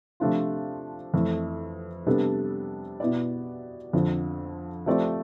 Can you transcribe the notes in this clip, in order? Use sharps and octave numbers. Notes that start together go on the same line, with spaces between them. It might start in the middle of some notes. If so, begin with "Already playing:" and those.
C3 F3 A3 D4 F4
F2 E3 A3
C3 G3 B3 D4 A4
B2 B3 E4 B4 D5
F2 D3 F3
F3 A3 C4 G4 D5